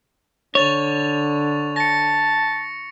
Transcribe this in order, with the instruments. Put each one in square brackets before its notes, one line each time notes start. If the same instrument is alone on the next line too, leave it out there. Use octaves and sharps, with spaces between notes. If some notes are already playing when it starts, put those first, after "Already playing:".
[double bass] D3 [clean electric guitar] C#5 [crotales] C#6 A6 F7
[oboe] A5 [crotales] A#6 C#7